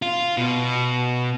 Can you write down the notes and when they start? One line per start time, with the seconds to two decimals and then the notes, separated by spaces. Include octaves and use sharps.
0.02 F4
0.37 B2